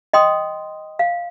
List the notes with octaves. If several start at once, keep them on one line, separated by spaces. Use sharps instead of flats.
D#5 G5 C6 D#6
F5